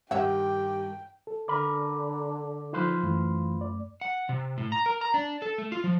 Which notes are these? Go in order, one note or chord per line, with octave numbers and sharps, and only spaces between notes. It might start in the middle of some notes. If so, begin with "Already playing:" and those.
G2 D#3 G4 C#5 E5 F#5 G5
A4
D3 A#4 B4 D6
F3 D#4 F4 B4 C5
F#2 E3 A3
D5
F#5
C3
A2
A#5
A#4
A#5
D4
A4
A3
F4
F3